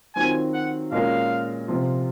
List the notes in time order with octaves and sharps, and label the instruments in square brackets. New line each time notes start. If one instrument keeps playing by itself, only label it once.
[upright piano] D#3 F#3 C4 F4 [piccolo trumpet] G#5
[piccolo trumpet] F#5
[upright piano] A#2 G#3 C#4 F#4 A#4 [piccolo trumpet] F5
[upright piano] C3 F3 C4 F4